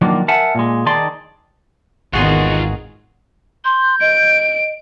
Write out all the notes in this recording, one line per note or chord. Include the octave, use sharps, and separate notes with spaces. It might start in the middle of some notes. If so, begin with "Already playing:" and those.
D#3 F3 F#3 A#3 D4
A#4 E5 F#5 G#5 A5
A#2 G#3
D#3 D#4 G#4 D5 A5 C6
G#1 E2 D#3 F4 F#4 G#4 F#5 C6
C6 G6
D#5 D7